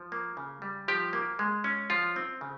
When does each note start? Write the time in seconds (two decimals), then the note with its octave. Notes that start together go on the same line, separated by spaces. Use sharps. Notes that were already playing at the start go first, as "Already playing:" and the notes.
Already playing: F3
0.12 A#3
0.37 C#3
0.62 G3
0.88 F3 G4
1.13 A#3
1.39 G#3
1.64 C#4
1.90 F3 F4
2.16 C4
2.41 C#3